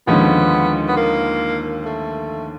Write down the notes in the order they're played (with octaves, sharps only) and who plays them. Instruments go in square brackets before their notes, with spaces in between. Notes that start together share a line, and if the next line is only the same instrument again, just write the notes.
[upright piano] D#2 D3 F3 G#3 C#4 [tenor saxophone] B3
[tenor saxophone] B3
A#3
A3